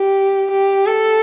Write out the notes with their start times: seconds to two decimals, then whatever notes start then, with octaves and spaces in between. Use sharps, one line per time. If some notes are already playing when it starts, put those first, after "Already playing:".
Already playing: G4
0.52 G4
0.86 A4